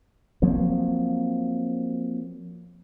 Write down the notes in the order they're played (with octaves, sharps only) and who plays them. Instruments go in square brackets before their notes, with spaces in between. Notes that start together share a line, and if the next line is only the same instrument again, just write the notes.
[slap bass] F3 F#3 A#3 C4